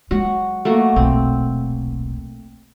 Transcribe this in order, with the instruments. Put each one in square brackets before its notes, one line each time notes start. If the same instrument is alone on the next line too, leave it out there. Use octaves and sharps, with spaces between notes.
[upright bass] F#3 G#3 [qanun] F#4 F#5
[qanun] A3 A#3 F#4
[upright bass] D#1 B1 [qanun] C4